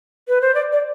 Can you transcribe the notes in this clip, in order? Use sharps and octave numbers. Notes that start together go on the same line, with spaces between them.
B4
C5
D5
D5